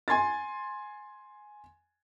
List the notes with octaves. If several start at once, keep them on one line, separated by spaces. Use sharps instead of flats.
G#5 C6 G#6 A6